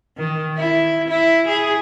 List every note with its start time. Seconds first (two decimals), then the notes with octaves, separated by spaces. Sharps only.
0.17 D#3
0.57 E4
1.08 E4
1.47 G#4